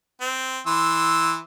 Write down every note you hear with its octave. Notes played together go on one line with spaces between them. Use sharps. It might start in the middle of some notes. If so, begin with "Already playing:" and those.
C4
E3 C6 E6